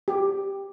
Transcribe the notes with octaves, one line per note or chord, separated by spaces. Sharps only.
G4